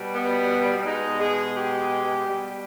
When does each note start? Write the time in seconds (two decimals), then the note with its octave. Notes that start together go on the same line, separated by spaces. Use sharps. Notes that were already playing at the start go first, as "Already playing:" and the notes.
Already playing: B2 G3
0.15 B3
0.85 B2 G#3 D#4
1.20 G#4
1.55 G4
2.25 B2 G3